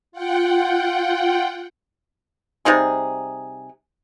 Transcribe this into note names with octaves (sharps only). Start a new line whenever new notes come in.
F4 F#5 G5
C3 G3 D#4 G#4